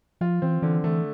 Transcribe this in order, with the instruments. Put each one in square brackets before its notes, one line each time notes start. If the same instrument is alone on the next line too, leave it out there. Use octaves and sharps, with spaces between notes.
[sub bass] F3 [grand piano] F4
[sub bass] E3 [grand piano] C4
[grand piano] D3 [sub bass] E3
[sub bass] E3 [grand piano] A3